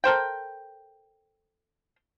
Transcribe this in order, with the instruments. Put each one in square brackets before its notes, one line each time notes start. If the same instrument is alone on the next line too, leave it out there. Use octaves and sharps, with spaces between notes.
[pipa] A4 A#4 C5 G5